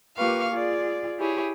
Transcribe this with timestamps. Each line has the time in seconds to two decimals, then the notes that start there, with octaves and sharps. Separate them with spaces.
0.18 A#3 F4 G4 B4 F5 C#6
0.52 F4 G#4 D5
1.19 E4 G4 G#4 C#5